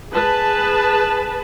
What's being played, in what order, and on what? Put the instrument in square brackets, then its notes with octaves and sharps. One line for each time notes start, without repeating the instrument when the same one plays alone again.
[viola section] G#4 B4 A5